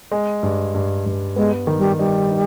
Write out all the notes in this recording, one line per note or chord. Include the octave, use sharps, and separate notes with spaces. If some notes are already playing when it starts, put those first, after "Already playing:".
G#3
G2
G2
G2
G#3 B3
D#3
G3
G3 D#4
D#4